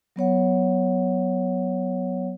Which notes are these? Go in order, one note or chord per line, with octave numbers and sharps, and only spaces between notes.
F#3 B3 C#5 F#5